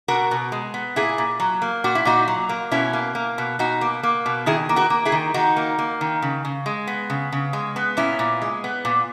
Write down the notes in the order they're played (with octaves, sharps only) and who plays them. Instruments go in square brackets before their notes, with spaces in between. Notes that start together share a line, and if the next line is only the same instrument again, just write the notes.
[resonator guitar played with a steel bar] B2 F#4 A#4
B2
G#3
B3
A#2 E4 G#4
A#2
F#3
A#3
A#2 F#4
E4
A#2 D#4 F#4
F#3
A#3
B2 C#4 E4
A#3
A#3
B2
B2 D#4 F#4
A#3
A#3
B2
D#3 E4 G#4
A#3
F#4 A#4
A#3
E4 G#4
D#3
D#3 D#4 F#4
A#3
A#3
D#3
C#3
C#3
G#3
B3
C#3
C#3
G#3
B3
A#2 C#4 E4
A#2
G#3
B3
A#2